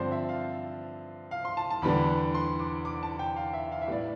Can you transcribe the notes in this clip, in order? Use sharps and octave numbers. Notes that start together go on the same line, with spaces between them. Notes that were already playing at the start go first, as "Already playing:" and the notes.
Already playing: G2 D3 F3 C4 C5 D5
E5
F5
F5
C6
A5
A5
E2 D3 G3 B3 D4 B5
C6
D6
D6
A5
G5
F5
E5
F5
E5
A2 G3 B3 D5